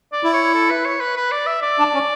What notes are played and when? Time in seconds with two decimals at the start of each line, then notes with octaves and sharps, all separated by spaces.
0.13 D5
0.24 E4
0.33 C#5
0.54 A4
0.70 B4
0.85 C#5
1.00 B4
1.16 B4
1.32 D5
1.47 E5
1.62 D5
1.79 D4
1.94 C#4